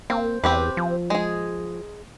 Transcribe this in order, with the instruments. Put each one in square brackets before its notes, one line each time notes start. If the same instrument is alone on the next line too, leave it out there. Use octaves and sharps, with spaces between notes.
[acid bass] A#3 [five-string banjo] C4
[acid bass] E2 [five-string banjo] C4 G4 B4
[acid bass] F3
[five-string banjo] G#3 G#4